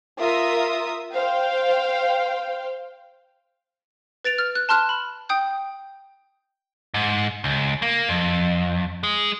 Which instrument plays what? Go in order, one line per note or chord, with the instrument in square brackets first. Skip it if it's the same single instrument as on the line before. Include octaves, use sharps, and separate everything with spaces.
[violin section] F4 A#4 E5 D#6
C5 F5 G5
[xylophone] B4 A6 D7 F7
F6
F#6
A5 C6 F6 F#6
B5
G5 D#6 G6
[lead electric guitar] G#2
C#2
A#3
F2
G#3